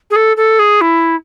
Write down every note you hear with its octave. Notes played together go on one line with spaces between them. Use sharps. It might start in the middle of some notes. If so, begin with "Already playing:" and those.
G#4
A4
A4
G#4
E4